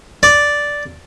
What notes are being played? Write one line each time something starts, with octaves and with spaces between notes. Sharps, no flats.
D5